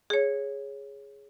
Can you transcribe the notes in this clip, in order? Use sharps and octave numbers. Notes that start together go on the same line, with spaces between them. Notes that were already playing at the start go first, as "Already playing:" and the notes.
G#4 C#5